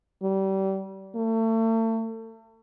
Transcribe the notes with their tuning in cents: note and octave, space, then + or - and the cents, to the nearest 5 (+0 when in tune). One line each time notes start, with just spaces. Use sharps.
G3 -30
A3 +35